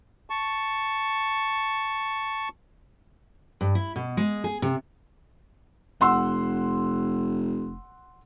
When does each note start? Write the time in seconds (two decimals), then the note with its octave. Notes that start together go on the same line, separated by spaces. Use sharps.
0.30 A5 C#6
3.61 G2
3.75 E4
3.96 B2
4.17 G#3
4.44 G#4
4.62 C3
6.01 F1 F#5 C6 E6